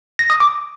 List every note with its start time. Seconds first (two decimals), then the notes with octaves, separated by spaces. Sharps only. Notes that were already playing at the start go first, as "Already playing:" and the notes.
0.19 A#6
0.30 D#6
0.40 D6